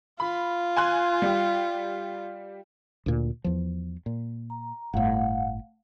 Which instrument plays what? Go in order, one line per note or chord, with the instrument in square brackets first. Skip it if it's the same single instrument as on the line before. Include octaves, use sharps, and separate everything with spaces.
[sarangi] F4 [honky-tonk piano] B5
[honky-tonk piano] G#5 C6 F#6
G3 G4
[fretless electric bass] D2 A#2
E2 F3
A#2
[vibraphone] A#5
[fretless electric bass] G1 A2 [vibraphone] A3 F5 F#5